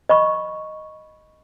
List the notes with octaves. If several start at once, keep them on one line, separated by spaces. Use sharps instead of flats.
D#5 B5 C#6